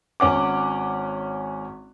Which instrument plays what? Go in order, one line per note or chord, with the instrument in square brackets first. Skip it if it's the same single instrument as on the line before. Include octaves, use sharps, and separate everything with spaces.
[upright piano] G#1 C#4 F#5 D6